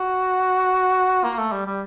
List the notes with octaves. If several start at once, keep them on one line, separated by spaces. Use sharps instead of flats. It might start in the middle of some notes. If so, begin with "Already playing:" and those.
Already playing: F#4
A#3
A3
G3
G3